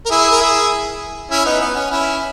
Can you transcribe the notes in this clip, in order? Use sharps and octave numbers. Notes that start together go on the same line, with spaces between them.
A#4
E4 G#4
A#4
E4 G#4
C#4 E4
B3 D#4
B3
C#4
C#4 E4